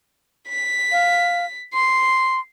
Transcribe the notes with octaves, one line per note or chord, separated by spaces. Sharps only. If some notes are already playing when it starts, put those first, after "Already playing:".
B6
F5
C6 C7